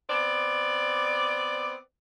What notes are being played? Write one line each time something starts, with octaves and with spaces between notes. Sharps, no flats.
B3 C4 D5